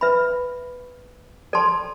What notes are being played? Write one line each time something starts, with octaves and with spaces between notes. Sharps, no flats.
B4 E5 B5
A4 D5 A5 C6